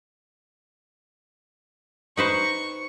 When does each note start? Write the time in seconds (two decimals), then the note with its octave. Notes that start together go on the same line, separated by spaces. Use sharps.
2.17 D#4 B4 C5 C#6